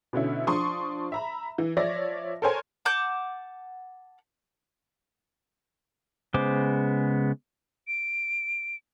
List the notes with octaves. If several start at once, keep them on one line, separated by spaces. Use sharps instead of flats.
B2 D3 C#4 E4
F3 D4 C6 C#6 D#6
E5 A#5 B5
E3
F3 C#5 D5 E5 A#6
A4 A#4 C5 C#5 G#5
F#5 A5 D6 G6
C#3 G#3 B3 C5 D6
D7